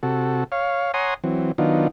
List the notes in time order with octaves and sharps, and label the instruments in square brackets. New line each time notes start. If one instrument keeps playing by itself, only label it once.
[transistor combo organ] C3 F#4 A4
C#5 F5
C#5 F#5 G#5 A#5 C6 D#6
E3 F#3 C4
D#3 F#3 B3 D4 D#4 F4